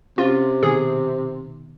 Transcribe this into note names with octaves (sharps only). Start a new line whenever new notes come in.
C3 C#4 F4
B2 D#3 G#4